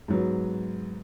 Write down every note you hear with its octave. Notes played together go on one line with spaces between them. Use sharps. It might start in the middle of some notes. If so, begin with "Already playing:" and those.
G#2 F#3 B3